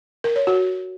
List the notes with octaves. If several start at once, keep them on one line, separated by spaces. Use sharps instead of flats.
A#4
C#5
F#4